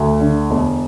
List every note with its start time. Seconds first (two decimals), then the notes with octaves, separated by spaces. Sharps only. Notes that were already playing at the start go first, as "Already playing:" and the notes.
Already playing: D2
0.21 D3
0.51 E1